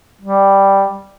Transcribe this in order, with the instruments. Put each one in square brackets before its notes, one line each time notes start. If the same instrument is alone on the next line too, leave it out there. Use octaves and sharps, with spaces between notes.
[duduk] G3